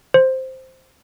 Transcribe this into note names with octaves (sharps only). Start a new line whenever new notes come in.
C5